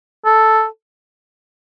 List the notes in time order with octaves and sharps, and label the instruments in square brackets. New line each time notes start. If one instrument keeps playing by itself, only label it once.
[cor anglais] A4